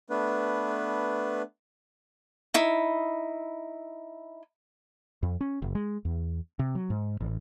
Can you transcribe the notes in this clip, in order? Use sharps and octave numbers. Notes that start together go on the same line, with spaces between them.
A3 B3 D4 B4
D#4 E4
F2
C#4
F#1
G#3
E2
C3
F#3
G#2
A1